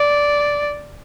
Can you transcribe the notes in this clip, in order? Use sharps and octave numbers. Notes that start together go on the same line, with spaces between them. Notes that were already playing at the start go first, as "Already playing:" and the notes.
Already playing: D5